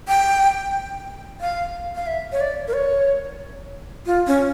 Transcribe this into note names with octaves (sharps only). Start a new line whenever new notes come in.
G5
F5
F5
E5
C#5
D5
A#4
C#5
F4
C#4